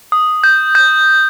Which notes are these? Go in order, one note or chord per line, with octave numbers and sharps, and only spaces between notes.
D#6
G6
G6